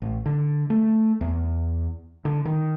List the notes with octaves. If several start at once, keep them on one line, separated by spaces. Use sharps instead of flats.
A1
D3
A3
E2
D3
D#3